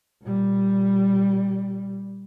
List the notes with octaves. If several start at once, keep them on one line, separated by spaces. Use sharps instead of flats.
A#2 G3